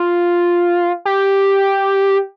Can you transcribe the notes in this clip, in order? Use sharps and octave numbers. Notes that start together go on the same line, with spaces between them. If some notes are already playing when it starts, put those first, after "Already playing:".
Already playing: F4
G4